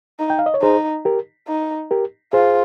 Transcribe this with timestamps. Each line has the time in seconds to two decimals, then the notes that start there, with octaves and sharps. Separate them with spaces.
0.19 D#4
0.30 G5
0.39 F5
0.46 D#5
0.54 C#5
0.62 D#4 G#4 C5
1.05 G4 A#4
1.48 D#4
1.91 G4 A#4
2.33 F4 G#4 C5